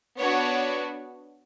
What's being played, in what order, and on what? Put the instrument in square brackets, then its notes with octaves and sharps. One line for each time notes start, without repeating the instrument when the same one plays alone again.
[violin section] B3 D4 F#4 C#5